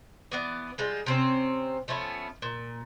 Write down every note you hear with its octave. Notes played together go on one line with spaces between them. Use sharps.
E3 B3 D5
G3 G#3 F4
C3 C4 C#4
F3 A3 B3 C#4
A#2